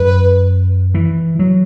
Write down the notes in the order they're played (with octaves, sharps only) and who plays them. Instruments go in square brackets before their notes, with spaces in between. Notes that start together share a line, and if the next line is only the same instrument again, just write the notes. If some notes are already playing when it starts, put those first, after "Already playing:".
Already playing: [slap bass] F#2 [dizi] B4
[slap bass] E3
F#3